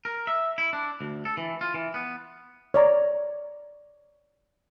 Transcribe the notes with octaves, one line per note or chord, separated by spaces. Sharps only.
A#4
E5
E4
D4
D2
A4
E3
F4
E3
B3
C#5 D5 A#5